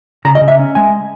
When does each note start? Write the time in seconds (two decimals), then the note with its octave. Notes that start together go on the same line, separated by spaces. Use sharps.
0.25 C#3 A#5
0.35 D#5
0.41 C#3
0.48 E5
0.59 C#4
0.75 G#3 G#5